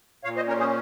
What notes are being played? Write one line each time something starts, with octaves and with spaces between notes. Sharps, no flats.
A#2 C#5 F5
C5 D#5
C#4 A#4 C#5
G#4 C5